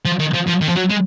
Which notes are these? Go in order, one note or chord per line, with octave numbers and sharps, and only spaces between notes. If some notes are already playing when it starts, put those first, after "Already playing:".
F3
D#3
F3
F3
D#3
F3
F#3
G#3